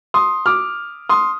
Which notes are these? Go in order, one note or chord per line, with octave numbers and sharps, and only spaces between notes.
C6 D#6
D6 F6
C6 D#6